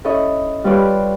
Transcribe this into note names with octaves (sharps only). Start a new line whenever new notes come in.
C#4 E4 A4 C#5 D#5 E5
G3 F4 B4 C#5 D5